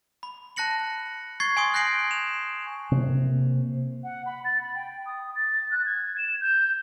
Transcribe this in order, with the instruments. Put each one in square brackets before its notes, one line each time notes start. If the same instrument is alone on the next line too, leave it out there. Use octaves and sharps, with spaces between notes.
[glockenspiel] B5
A5 F#6 A#6 C#7 F#7
C#6 G#6 A6 C7
G#5 C6 C#6 D#6
F#6 G6 A#6 C7 D7 F#7
E7 F7
[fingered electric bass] C3 A#3
[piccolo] F#5
B5
A6
B5
G5
D#6
A6
F#6
G#6
E7
G6